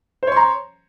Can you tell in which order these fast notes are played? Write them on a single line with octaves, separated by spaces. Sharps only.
C5 C#5 C6 A#5